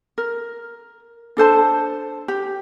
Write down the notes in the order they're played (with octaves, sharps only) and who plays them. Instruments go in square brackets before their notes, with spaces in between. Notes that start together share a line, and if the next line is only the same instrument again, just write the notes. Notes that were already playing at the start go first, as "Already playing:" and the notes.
[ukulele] A#4
D4 A4 C5 A5
G4